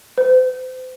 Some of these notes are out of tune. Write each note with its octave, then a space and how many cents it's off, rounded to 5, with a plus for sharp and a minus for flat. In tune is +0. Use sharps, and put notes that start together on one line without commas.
C5 -35